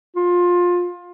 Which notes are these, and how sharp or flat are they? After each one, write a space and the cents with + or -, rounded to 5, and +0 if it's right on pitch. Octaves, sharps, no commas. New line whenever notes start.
F4 +20